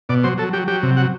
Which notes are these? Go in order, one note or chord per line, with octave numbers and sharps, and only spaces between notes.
B2 D5
F#3 C5
F#3 A4
F#3 G4
F#3 G4
C3
F#3 F#5